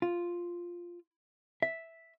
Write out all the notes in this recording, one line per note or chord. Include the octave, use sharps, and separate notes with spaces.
F4
E5